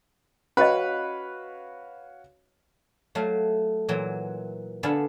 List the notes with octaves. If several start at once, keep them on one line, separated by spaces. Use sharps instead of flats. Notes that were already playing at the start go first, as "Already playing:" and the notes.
C#4 F#4 B4 C#5 D#5 F5
F#3 A3 F5
A#2 E3 F#3
D3 B3 F5 G#5 A5 B5